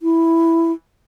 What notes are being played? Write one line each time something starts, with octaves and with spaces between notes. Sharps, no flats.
E4